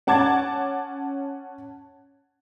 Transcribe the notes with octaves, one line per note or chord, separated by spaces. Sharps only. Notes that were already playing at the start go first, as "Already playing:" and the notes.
C#4 F#5 A5 D6 G#6 A6